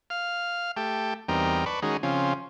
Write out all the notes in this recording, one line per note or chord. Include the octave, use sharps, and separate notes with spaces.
F5 F6
A3 G4 G5 A5
E2 G3 C4 D#4 A#4 G5
B4 D5 A5 B5 C#6
D#3 G#3 C#4 D#4 F#4 G#4
C#3 F3 C4 C#4 F4